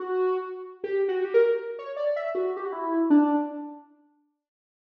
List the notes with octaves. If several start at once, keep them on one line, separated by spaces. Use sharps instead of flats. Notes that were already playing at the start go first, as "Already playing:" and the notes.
Already playing: F#4
G4
F#4
G4
A#4
C#5
D5
E5
F#4
G4
F#4
E4
D4